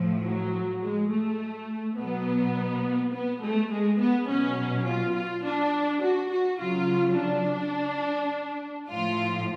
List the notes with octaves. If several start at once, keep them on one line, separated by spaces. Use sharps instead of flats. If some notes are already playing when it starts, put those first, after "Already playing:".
Already playing: A2 F3
F#3
G#3
A3
B2 F#3 B3
B3
A3
G#3
B3
B2 F#3 C#4
F4
F4
D4
F#4
F#4
C#3 F#3 F4
D4
A2 F3 F4